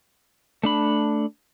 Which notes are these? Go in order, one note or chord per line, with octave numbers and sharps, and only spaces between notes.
A3 D4 B5